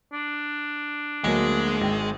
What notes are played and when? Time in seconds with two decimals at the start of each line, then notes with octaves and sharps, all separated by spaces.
0.13 D4
1.24 D2 F#3 G#3 A#3
1.81 G#1 G5